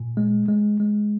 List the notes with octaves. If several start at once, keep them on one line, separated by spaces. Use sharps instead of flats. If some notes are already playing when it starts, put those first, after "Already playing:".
Already playing: A#2
G#3
G#3
G#3